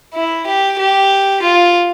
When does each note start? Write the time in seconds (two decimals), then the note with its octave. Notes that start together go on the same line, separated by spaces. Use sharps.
0.14 E4
0.46 G4
0.79 G4
1.42 F4